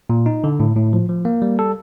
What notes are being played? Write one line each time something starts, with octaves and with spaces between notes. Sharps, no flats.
A#2
D#4
D3
A2
A2
F3
F3
A#3
G3
A4